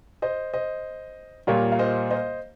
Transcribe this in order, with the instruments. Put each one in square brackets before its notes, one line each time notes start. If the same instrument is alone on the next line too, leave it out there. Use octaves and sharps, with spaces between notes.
[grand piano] C5 D#5
C5 D#5
[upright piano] A#2 G3 A#3 F4 [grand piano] A#4 C#5
[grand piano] F5
C5 D#5
C5 D#5